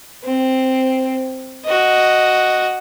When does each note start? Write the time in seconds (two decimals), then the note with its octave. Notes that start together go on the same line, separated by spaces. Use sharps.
0.24 C4
1.65 F#4 D#5